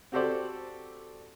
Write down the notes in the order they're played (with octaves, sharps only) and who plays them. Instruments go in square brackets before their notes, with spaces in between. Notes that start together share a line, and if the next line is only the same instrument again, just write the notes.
[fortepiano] C4 F#4 G4 A4 C5 D5